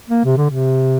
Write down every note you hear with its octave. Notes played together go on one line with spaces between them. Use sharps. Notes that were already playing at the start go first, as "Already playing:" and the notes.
A#3
C3
D3
C3